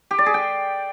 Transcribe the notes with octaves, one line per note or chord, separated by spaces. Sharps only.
G4
D5
G#4
G5